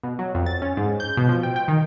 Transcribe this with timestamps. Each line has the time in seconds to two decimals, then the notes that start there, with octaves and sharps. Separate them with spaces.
0.03 B2
0.19 F#3
0.35 F2
0.46 A6
0.62 C#4
0.77 G#2
1.00 G6
1.17 B2
1.29 F3
1.43 G5
1.56 G5
1.68 D#3